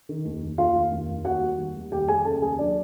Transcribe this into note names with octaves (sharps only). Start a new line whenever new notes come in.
D#3
D#2
D#2
D#2 F4 F5
D#2
D#2
D#2
D#3 F#4 F#5
G3
D#2
G3
D#2 G4 G5
D#2 G#4 G#5
C#3 A4 A5
D#2 G#4 G#5
F#3 D4 D5